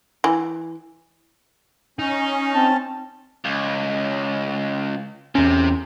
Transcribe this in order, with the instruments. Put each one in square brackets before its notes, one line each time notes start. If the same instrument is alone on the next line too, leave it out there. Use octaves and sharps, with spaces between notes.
[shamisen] E3
[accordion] C#4 [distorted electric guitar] D#4
[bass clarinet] C4 [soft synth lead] A5
[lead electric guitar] C#2
[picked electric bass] E2 C#4 [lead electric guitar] C3